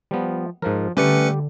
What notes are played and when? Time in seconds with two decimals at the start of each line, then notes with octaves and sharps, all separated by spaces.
0.11 F3 G3 B3
0.62 G#2 F3 A#4
0.97 D3 G3 A3 C#4 G4 B4 C#7